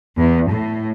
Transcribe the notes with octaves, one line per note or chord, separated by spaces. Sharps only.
E2
A2